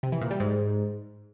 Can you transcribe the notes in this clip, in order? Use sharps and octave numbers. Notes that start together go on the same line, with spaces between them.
C3
E3
A#2
G3
G#2